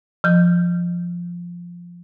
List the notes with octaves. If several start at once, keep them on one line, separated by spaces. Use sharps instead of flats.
F3 G6